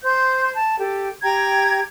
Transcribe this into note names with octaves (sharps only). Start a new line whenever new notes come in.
C5 C6 G6
A5
G4 A4
G4 G5 A#5 G#6